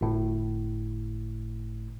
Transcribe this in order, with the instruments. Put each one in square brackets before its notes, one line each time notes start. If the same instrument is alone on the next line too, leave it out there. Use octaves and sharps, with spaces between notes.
[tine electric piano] G1 A2